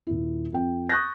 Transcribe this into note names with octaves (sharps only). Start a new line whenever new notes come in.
D#1 E4
F2 G5
C#6 D#6 F#6 G6 A6 A#6